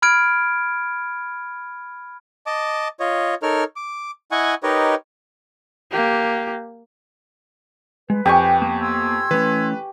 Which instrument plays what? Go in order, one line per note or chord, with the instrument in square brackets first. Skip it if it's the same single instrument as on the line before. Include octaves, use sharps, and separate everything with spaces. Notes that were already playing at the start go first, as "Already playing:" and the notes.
[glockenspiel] B5 F6 G#6 D7
[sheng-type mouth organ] D#5 A5 D6
F4 C#5 D#5
D#4 A4 A#4 C#5 F6
D6
E4 D#5 F#5 G#5 C#6
D#4 G4 A#4 B4 C#5 D#5
[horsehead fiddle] A#3 G4
[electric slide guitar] G#3 [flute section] B4
[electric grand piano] F2 [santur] G4 G#5 C#6 [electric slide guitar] G5
[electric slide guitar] A#3 B3
[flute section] C6 E6 G#6
[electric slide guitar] E3 A3 C#4 [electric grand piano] B4